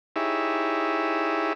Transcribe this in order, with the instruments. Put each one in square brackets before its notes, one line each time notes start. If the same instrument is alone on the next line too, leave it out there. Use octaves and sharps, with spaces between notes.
[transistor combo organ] D#4 E4 G4 G#4 C#5 E5